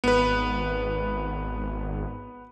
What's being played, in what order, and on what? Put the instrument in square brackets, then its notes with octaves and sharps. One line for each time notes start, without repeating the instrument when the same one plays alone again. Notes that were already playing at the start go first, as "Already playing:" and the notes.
[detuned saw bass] G#1 [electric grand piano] B3 B4